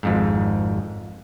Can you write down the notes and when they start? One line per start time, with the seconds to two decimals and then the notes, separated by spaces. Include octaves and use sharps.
0.03 G#1 F2 G#2